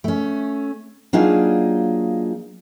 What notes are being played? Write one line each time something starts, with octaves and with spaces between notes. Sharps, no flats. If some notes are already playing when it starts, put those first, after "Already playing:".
A3 C#4
F#3 A#3 D4 D#4 F4 G#4